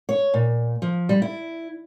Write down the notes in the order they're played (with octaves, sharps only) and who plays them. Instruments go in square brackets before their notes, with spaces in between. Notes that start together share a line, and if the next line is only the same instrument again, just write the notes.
[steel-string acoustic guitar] C#5
A#2
F3
G3
E4